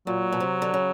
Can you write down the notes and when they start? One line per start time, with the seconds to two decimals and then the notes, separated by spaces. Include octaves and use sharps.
0.07 A#2 F#3
0.32 B2
0.40 C3
0.62 D3
0.74 C#3